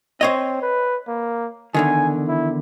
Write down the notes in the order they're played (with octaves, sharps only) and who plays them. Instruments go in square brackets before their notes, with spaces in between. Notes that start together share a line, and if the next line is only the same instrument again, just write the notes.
[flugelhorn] C4 [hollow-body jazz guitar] C5 C#5 D#5
[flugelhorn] B4
A#3
[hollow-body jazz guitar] E2 D3 D#3 [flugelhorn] G#5
[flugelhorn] E4